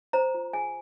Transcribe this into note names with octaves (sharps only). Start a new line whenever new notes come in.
C5 A#5
F4
G#4 G#5